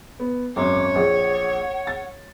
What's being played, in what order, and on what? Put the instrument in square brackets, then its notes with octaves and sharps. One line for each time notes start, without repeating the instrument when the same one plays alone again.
[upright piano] B3
[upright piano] G#1 F#2 C6 [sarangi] C#5 [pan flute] D6
[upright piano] A#1 G#4 [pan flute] F#5
[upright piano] A6